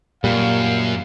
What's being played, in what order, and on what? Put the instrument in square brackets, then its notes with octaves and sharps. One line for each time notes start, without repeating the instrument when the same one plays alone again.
[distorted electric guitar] F#2 [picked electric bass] A#2 G3 [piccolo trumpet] F5